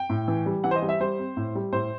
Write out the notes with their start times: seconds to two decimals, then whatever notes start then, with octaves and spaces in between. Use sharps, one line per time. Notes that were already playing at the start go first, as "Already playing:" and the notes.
Already playing: G5
0.10 A2
0.28 E3
0.46 G3
0.64 E3 F#5
0.71 C5
0.76 D#5
0.82 G3
0.89 E5
1.00 G3 C5
1.19 C4
1.37 A2
1.55 G3
1.73 A2 C5